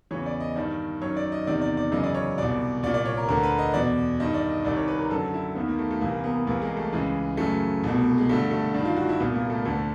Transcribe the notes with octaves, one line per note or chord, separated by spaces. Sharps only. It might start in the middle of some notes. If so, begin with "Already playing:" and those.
E2 C#3 E3 C#5
D5
D#5
G2 D#3 D5
F#2 D#3 C#5
D5
D#5
E2 C3 D#3 D5
D5
D5
F#2 C#3 E3 D#5
D5
C#5
C2 B2 D5
C2 A#2 D5
D5
C#5
A#4
D2 D3 A#4
B4
D#5
E2 B2 D5
G2 D#3 D#5
D5
D#5
C2 C3 D#3 D5
C#5
B4
A#4
F#2 D3 A4
E4
D#2 D#3 B3
A#3
A3
A3
C2 C3 E3 A#3
B3
C2 C3 E3 A#3
G#3
A3
C#2 C#3 E3 G#3
F#2 C#3 E3 A3
C2 B2
G#3
G2 D3 A3
A3
G2 D#3 D4
F4
F#4
E4
C2 A#2 B3
A#3
A3
D2 D3 A3